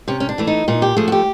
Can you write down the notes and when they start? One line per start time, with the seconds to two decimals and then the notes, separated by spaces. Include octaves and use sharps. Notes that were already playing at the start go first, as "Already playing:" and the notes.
0.08 C3 C#4
0.20 C#4
0.29 D4
0.38 E3 A3
0.47 D#4
0.68 A#2 D#4
0.82 G4
0.96 F3 A3 G#4
1.08 F#4
1.12 G4